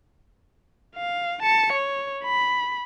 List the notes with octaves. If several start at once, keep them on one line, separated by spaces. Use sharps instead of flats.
F5
A5 C#7
C#5
B5